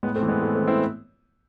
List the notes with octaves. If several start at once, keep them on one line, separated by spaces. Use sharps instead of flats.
A2 G#3 B3
A3 C4
E3
G#3 B3
A2 A3
A3 C4
E3
C4 E4